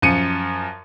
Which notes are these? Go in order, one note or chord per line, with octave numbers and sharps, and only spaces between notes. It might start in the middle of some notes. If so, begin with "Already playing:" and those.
F#2 F3 C#7 D#7